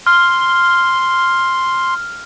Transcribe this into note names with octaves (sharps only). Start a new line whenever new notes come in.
C6 F6